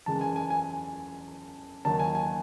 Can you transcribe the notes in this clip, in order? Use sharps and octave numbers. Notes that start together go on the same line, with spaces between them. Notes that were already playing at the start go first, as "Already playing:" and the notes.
F#2 E3 G#3 A5
G#5
G#5
G#5
D#2 D#3 F#3 A5
G#5
G#5